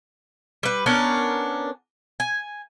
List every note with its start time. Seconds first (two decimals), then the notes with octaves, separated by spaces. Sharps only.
0.63 G3 B4
0.86 B3 C#4 D4 A#4
2.20 G#5